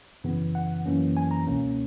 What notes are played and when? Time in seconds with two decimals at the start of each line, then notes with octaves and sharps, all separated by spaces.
0.24 F#2 C#3 E3 B3
0.55 F#5
0.86 F#2 E3 A#3 C#4
1.17 G#5
1.31 A#5
1.47 C#2 B2 A#3 C#4